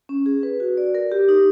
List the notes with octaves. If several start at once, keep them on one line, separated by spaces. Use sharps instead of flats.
C#4
G#4
B4
F#4
D5
A#4
G4
D#4